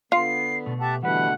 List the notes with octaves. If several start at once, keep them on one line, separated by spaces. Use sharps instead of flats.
D3 B3 F4 C7
B2 A3
G4 E5 F#5 A5
B2 D3 E3 G3 A3 B4 F#5